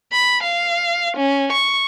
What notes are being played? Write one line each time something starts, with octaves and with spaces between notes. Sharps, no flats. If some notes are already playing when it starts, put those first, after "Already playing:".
B5
F5
C#4
C#6